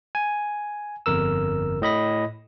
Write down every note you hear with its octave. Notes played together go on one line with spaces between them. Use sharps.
G#5
G1 F2 A#4 E6
A2 D#5 B5 A#6